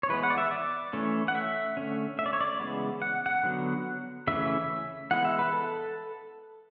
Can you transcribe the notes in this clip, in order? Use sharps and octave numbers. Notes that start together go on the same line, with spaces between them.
C#5
E3 G#3 B3 B4
F#5
D5
E5
D5
E3 A3 C#4
F#5
E5
D3 A3 C#4
E5
D5
C#5
D5
C#3 E3 G#3 B3
F#5
F#5
D3 F#3 B3
C#3 E3 A3 C#4 E5
E3 G#3 B3 F#5
E5
B4
A4